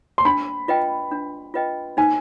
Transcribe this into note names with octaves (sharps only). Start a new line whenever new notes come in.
C6
D4 B5
F4 B4 D#5 G5
D4
F4 B4 D#5 G5
D#4 G#5